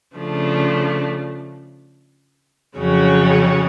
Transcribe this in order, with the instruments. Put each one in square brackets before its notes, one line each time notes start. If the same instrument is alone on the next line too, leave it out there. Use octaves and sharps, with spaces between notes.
[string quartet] C#3 F3 A3 D4
F2 C#3 F#3 C#4